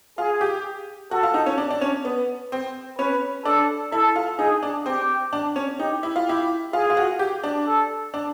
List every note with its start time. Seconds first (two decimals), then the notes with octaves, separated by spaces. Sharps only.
0.18 F4 G#4
0.41 G4
1.11 F#4 A4
1.23 F4
1.34 D#4
1.46 C#4
1.58 D4
1.71 D4
1.81 C#4
2.05 B3
2.52 C4
2.98 C#4 B4
3.45 D4 A4
3.92 E4 A4
4.16 F4
4.38 D#4 G#4
4.63 D4
4.86 C4 G4
5.33 D4
5.56 C#4
5.79 D#4 G4
6.03 E4
6.16 F4
6.27 E4 G4
6.73 F4 G#4
6.90 F4
6.97 F#4
7.19 G4
7.44 D4
7.67 A4
8.14 D4